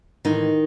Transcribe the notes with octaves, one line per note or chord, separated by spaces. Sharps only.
A2 D#3 E3 G#3 D#4